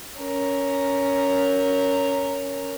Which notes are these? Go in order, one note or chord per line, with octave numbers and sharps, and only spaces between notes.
C#4 A#4